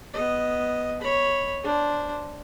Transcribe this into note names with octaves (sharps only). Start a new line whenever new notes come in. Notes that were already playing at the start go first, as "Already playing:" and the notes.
B3 D#5
C#5 B5
D4 C5